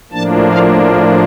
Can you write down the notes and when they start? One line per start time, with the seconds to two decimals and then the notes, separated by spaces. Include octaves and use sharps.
0.12 A2 F3 A#3 D4 A5
0.48 F5